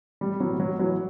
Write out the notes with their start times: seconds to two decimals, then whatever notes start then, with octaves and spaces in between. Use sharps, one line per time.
0.21 A1 G3
0.40 A2 E3 F#3
0.60 A1 F#3
0.79 A2 E3 F#3